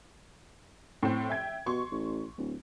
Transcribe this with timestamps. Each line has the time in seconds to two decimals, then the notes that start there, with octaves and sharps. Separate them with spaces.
1.03 A2 C4
1.29 E5 G5 G#6
1.66 B2 C6 C#6
1.91 A1
2.37 D1